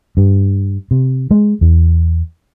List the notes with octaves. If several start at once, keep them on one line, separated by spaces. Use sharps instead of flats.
G2
C3
G#3
E2